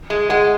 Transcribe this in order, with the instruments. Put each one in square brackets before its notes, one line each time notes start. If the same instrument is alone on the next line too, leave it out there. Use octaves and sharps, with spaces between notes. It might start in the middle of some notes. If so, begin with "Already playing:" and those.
[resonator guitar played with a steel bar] G#3
[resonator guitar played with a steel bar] G#3 [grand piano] F#5